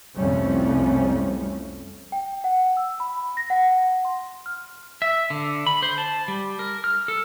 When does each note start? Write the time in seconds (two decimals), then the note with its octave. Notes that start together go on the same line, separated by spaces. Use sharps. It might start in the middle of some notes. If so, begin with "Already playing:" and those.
0.16 C2 F2 G3 A3 C#4
2.12 G5
2.44 F#5
2.77 E6
3.00 B5
3.37 A#6
3.50 F#5
4.05 C6
4.46 F6
5.02 E5
5.30 D3
5.67 B5
5.83 C5
5.98 A5
6.28 G3
6.59 A#4
6.84 F6
7.08 A4